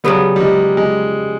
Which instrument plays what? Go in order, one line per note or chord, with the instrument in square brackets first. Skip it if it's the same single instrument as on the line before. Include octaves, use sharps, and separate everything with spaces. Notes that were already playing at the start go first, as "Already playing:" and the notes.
[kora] C#3 F#3 B3 [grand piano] G3
[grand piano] G3
G#3
G#3